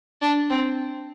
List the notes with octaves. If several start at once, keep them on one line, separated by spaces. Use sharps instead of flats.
D4
C4